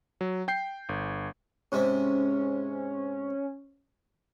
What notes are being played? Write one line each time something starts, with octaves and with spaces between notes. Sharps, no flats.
F#3
G5 G6 C7
G1
G#2 C3 C4 C#4